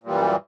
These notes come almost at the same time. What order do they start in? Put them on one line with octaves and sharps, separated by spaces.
A#2 G3 E3 F#2